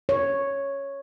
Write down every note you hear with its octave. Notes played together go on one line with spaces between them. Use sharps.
C#5